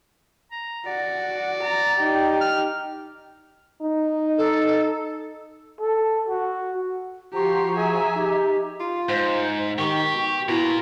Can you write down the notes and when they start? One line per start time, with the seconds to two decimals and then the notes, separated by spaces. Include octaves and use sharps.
0.52 A#5
0.86 F#4 D5
1.62 A#5
1.98 D#4 G4
2.41 F6
3.82 D#4
4.37 A4
5.80 A4
6.29 F#4
7.33 F3 F#4 G4 A#5 C6 C#6
7.75 G#4 E5 G#5
8.16 D#4 G4
8.80 F4
9.09 G#2 C5
9.78 D#3 G4 C#6
10.14 B2
10.49 B2 E4 F4 A#4